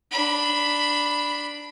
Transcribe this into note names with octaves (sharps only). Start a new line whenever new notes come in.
D4 B5